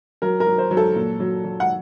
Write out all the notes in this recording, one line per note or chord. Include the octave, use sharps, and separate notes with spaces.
F#3 A#4
A#4
F#3
C5
F#3
A4
A#2
F#3
F#3
F#5